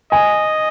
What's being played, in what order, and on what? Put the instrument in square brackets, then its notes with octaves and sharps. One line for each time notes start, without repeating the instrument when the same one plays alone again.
[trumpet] D#5 [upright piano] G#5